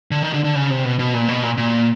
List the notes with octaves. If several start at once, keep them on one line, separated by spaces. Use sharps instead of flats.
D3
D#3
D3
D3
C#3
C3
B2
B2
A#2
B2
A#2
A#2